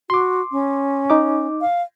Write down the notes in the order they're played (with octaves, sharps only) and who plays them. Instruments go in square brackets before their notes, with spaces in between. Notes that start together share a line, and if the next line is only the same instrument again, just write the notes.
[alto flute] F#4 [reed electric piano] C6 D6
[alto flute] C#4
[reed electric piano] D#4 D6
[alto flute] F5